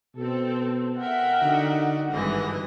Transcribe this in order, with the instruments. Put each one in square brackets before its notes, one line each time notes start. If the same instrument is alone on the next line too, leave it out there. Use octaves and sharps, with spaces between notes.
[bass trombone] B2 [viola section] C4 A4
[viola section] A#4 E5 G5 [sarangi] F#5
[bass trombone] D3 [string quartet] D#4 F#4 D5
[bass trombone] G#1 [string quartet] G2 D#5 [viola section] D3 E3